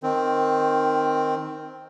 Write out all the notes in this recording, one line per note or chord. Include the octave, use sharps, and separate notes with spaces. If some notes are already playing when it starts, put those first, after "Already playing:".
D#3 C4